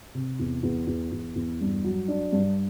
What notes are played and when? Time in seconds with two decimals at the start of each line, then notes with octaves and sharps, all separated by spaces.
0.14 C3
0.39 E2
0.63 E2
0.87 E2
1.12 E2
1.36 E2
1.61 G2
1.84 F#3
2.08 D4
2.32 G2